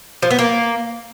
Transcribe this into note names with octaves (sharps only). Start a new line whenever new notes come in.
F3
B3
A#3